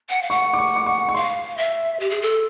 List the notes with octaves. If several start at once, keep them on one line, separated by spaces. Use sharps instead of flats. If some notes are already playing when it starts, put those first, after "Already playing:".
F#5
F5
F#5 C#6
D6
C#6
D6
C#6
C#6
F5 C6
E5
G4
G#4
A4